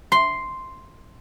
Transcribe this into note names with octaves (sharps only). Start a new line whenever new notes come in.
C6